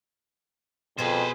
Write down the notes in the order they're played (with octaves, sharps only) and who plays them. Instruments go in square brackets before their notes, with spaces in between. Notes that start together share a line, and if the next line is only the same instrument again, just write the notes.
[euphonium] F2 [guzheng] B2 G#4 [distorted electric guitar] B4 C5